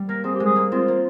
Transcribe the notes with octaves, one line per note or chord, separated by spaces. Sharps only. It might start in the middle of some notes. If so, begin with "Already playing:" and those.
Already playing: G3
A#3 A#4
C4 G#4
G4
G#3
G#4
A#3
C4 F4
A#3